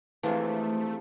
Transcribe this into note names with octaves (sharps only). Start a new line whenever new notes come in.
C3 E3 F3 G#3 A3 D4